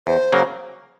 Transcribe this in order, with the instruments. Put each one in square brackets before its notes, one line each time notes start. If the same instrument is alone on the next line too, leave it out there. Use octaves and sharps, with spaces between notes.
[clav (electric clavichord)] E2 [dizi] C5
[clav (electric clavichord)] C#3 F#3 A#3